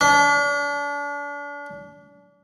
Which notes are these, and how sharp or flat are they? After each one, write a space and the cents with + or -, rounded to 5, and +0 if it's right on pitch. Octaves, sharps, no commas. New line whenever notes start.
D4 -35